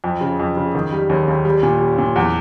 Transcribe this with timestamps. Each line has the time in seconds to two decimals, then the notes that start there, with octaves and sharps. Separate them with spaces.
0.04 F2
0.21 C#3
0.40 F2
0.57 C#3
0.75 D#3
0.93 G3
1.10 D#2
1.28 D#2
1.45 G3
1.63 A#2
1.80 G3
1.98 A#2
2.16 E2